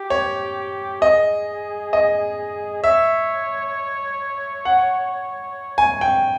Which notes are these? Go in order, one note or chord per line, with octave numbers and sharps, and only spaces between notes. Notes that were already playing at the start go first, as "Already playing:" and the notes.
Already playing: G4
C#5
G#4 D#5
D#5
C#5 E5
F#5
G#5
G5